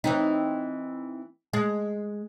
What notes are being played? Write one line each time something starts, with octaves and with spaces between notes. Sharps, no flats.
E3 C4 D#4
G#3